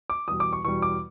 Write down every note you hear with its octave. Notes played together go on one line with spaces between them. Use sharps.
D6
E2 B2 G3 D#6
D6
C#6
E2 B2 G3 C#6
D6